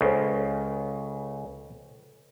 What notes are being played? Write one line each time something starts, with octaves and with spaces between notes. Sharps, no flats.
C#2 C#3 A4 C5